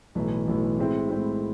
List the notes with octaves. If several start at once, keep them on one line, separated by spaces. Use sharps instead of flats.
B1 A2 E3
B1 A2 E3
A2 G#3 C4 E4
A2 G#3 C4 E4